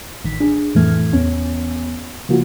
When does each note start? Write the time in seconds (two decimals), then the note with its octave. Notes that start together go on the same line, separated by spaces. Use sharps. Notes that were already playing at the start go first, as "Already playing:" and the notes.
0.24 A1 D#3 B6
0.40 D4 G#4
0.75 F2 A2 E3 A3 F6 G#6
1.13 E2 B3 C#4
2.29 C#3 F3 A#3 F4 F#4